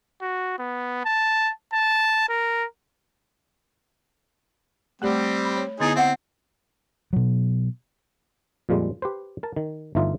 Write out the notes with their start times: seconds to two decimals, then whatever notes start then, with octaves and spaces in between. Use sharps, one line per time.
0.21 F#4
0.59 B3
1.05 A5
1.73 A5
2.29 A#4
5.02 G3 A3 C4 G4 D5
5.45 B5
5.57 C#5
5.80 D3 B3 D#4 E4 G#4
5.96 C4 D#5 E5 F#5
7.13 B2 F#3
8.69 F2 A#2 F3 G3 G#3
9.02 G4 B4 C5
9.43 A#4 A5
9.56 D#3
9.95 G1 E3 A3 D#4 F4 E5